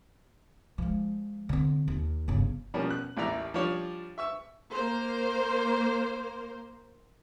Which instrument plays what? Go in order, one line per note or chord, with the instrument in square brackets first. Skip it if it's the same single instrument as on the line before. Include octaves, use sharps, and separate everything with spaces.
[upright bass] F3 G#3
D3 C4
D#2
G1 C#3
[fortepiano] B2 F3 G3 A#3 C#4
F#6
A1 D#2 E4 D5 E5 A#5
F3 G3 D4 F4 C#5 D5
E5 C#6 E6
[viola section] A#3 A#4 C5